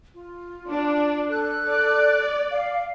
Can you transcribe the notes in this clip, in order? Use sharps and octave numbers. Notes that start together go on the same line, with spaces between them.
F4
D4
A4 F#6
D5
F5